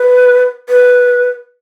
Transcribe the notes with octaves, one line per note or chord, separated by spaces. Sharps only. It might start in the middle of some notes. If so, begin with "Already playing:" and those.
Already playing: B4
B4